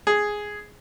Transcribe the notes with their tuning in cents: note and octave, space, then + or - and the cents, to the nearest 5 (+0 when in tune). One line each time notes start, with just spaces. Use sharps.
G#4 +0